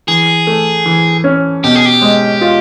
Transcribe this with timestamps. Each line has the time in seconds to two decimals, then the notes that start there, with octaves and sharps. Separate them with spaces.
0.08 E3 G#4
0.47 A3
0.86 E3
1.24 C#4
1.64 B2 G4
1.75 G#4
1.85 G4
2.02 G#3
2.41 F4